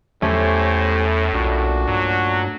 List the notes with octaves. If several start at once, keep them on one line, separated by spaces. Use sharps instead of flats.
E2 A2 A3 C#4 G4 C5 G#5
B1 A#2 D4 F#4
G2 F#3